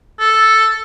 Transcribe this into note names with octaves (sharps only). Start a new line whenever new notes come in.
A4